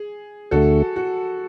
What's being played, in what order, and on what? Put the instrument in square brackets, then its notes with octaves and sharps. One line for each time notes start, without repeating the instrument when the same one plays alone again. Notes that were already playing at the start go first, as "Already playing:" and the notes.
Already playing: [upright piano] G#4
[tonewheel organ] D2 D3 A3 [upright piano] F#4 A4
[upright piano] F#4